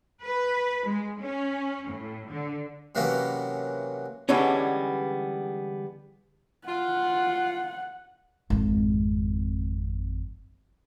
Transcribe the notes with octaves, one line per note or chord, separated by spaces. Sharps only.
B4
G#3
C#4
A2
D3
C3 E3 F#3 A#3 B3 C#4
D3 E3 G3 G#3 B3 C#4
F4 F#5
G#1 F2